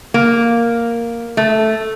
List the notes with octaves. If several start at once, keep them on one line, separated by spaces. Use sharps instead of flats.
A#3
A3